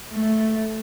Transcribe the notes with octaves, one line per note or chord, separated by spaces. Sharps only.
A3